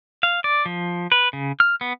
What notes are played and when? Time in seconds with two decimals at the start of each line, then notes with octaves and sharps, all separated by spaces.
0.23 F5
0.44 D5
0.66 F3
1.12 B4
1.33 C#3
1.60 F6
1.81 B3